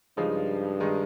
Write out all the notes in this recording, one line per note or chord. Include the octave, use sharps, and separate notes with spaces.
G2 C#3 F3 G#3 D#4
D#3 G#3 D#4